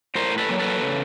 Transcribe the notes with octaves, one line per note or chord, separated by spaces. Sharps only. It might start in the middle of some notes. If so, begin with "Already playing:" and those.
A2 A#4 C5
A4 B4
F#3 A#3
A4 B4
C#3